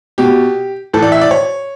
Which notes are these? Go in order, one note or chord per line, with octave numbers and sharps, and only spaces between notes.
B2 G4
A2 E3 A4
D5
E5
D5
C#5